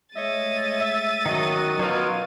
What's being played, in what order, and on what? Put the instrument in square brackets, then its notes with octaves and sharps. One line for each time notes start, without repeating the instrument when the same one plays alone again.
[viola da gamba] G#3 A3 [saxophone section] C#5 D#5 E5 [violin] A6 D#7
[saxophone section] E5
[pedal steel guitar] D#3 F#3 [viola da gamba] C#4 F#4 A#4 [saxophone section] D#5
[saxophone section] B2 D#4 [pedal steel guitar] F#3 F4